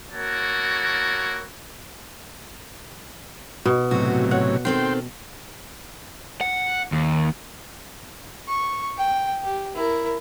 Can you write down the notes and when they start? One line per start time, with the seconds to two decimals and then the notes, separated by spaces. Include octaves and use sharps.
0.13 A#3 E4 F#4 A#4 C#5 A5
3.66 B2
3.91 A2 C3 F#3 F#4
4.31 C#5 F#5
4.65 D#3 C4 A4 G5 C6
6.41 F#5
6.92 D#2
8.49 C#6
8.97 G5
9.43 G4
9.76 E4 A#4